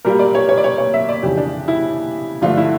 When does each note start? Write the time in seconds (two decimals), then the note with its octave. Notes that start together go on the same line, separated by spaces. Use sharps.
0.05 A#2 G3 A#3 A#4
0.19 D5
0.35 C#5
0.49 C#5
0.57 D5
0.64 C#5
0.78 C#5
0.94 E5
1.09 D5
1.23 F2 C#3 E3 G4
1.37 D4
1.68 E4
2.41 G2 D3 F3 A3 F4
2.57 E4